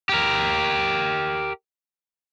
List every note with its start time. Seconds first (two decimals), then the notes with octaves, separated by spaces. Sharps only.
0.09 G4 A#4